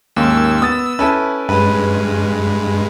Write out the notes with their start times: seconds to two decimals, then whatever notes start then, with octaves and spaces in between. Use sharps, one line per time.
0.16 D#2 G#2 A#3 C#4 E6
0.62 B3 D#6 A6
0.99 C#4 E4 A4 B4
1.49 G2 G#3 B4